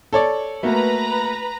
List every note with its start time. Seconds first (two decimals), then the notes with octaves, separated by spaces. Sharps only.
0.13 A4 C#5 D5
0.63 A3 A#3 F#4 B4 A#5